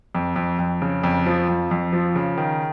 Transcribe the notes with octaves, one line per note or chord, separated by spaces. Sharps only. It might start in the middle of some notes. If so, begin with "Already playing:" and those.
F2
F2
F2
C#3
F2
F3
F2
F2
F3
C#3
D#3